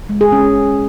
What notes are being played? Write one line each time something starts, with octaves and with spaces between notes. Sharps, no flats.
G#3
G#4
C#4